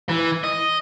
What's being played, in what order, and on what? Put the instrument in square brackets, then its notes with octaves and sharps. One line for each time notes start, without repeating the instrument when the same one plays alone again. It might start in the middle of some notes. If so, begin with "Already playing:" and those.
[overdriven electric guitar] E3
D#5